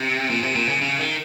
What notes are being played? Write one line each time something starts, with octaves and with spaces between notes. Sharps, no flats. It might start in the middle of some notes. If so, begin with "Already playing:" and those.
Already playing: C3
A#2
C3
A#2
C#3
C#3
D#3